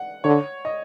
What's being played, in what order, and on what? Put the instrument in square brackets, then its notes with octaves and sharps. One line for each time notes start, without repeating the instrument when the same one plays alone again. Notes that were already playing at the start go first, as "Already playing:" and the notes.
Already playing: [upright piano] F#5
[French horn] D3 [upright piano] C#5
[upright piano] D#5